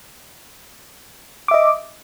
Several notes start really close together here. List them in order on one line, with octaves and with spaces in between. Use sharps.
D6 E5 D#5